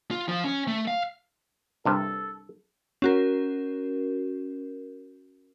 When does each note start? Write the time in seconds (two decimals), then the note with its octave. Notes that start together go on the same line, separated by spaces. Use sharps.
0.11 F4
0.29 F3
0.44 C#4
0.67 A3
0.87 F5
1.85 C2 G2 C3 A4
3.02 C#4 F#4 A#4